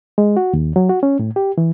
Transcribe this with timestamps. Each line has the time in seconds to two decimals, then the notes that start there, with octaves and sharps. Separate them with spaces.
0.18 G#3
0.37 F#4
0.53 D#2
0.76 F#3
0.89 F#4
1.03 C#4
1.19 A2
1.36 G4
1.58 E3